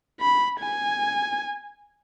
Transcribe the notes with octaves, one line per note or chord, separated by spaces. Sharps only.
B5
G#5